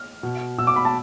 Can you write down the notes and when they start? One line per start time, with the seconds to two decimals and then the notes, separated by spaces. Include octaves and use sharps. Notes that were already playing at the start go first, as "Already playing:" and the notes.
Already playing: F6
0.23 B2
0.58 B2 E6
0.67 D6
0.76 B5
0.85 A5